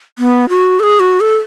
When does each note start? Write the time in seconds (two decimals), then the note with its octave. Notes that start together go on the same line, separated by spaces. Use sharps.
0.19 B3
0.49 F#4
0.80 A4
0.83 G#4
1.00 F#4
1.20 A4